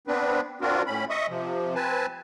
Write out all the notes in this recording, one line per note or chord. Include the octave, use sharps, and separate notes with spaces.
B3 C4 D4 B4
C4 D4 F4 F#4 A#4
A2 C#4 B5
D#5 E5 C#6 D#6
C3 F3
C4 B4 G#5 A5